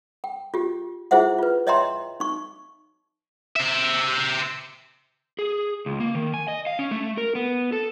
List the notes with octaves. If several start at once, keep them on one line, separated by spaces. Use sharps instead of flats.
G5
F4 G4
E4 F4 G#4 C5 E5 F#5
F4 B4
C#5 D#5 E5 G5 A#5 C6
D#4 C#6
C5 E5
G#4
C#2
A#3
D#3
G#5
D#5
F5
C#4
A3
A#4
B3
A4